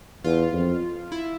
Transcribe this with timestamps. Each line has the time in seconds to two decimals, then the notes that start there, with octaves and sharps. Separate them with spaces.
0.24 E2 F4
0.53 F2
1.12 E4